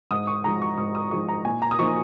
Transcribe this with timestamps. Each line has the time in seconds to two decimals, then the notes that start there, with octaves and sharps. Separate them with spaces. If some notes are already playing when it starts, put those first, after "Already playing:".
0.11 G#2 D#6
0.27 C#6
0.44 F3 G#3 D#4 A#5
0.62 C#6
0.78 G#2 D#6
0.95 D#6
1.11 F3 G#3 D#4 C#6
1.28 A#5
1.45 A#2 G#5
1.62 A#5
1.71 D#6
1.79 F3 A#3 D#4 C#6